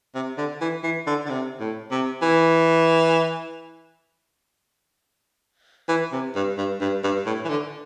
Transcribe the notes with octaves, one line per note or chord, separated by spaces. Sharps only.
C3
D3
E3
E3
D3
D3
C3
A2
C3
E3
E3
C3
G2
G2
G2
G2
A2
E3
D3